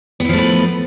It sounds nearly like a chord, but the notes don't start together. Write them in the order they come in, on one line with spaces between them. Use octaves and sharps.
B3 E4 F3 A3 B4